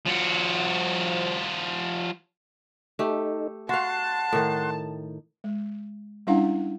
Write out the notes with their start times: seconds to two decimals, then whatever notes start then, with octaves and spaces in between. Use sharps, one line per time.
0.06 F3 F#4
2.99 A3 D#4 G4 A4
3.69 F#4 F5 F#5 A5 C6
4.33 A2 D#3
5.44 G#3
6.27 G3 C#4 D4 E4 F5 F#5